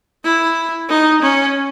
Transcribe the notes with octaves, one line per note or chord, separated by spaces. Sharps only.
E4
D#4
C#4